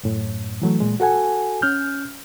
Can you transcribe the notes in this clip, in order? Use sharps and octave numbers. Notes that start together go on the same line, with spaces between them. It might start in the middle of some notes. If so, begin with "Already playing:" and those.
F#2 A2
E3 F#3 A3
A#2 G#3
F#4 A4 F#5 G#5
C#4 F6 G6